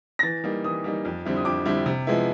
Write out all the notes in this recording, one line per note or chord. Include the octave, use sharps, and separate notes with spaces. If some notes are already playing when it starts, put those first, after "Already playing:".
A#6
E3 A6
G3 A#3 D#4
E3 D#6
G3 A#3 D#4
F2
D3 G3 C4 E4
D#6
F2 D6
D3 G3 C4 E4
C3
F3 G#3 B3 E4